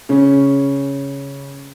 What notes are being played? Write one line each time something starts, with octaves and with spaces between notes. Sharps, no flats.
C#3 C#4